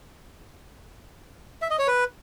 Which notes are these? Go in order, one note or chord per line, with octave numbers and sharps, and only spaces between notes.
E5
D#5
C#5
B4